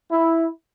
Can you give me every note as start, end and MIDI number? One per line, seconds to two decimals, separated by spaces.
0.12 0.49 64